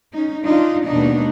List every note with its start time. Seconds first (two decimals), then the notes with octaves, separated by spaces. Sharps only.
0.13 C#4 D#4
0.44 D4 D#4 F4
0.87 D#2 B2 G#3 B3 D4 D#4